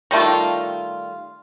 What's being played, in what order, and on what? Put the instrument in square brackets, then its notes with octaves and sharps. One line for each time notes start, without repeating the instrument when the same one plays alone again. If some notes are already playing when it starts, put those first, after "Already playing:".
[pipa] D#3 G3 A3 F4